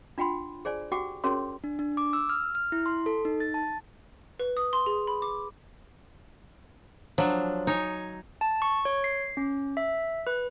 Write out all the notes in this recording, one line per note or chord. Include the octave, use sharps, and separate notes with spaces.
D4 F4 F#5 G5 B5 C6
G#4 C5 D5 G#5
F#4 G4 F#5 G5 D6
C#4 F#4 G#4 A#4 C#5 C6
D4
D4
D6
E6
F6
F6
E4
C6
A4
D#4
A6
A5
B4
D#6
C6
G#4
B5
D6
F3 F#3 D4
D#4 C#5 G#5
A5
C#6
C#5
C7
C#4
E5
B4